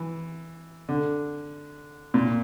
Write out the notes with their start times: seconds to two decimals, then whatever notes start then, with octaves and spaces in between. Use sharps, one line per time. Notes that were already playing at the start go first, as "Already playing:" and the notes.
Already playing: E3
0.89 D3
2.14 A#2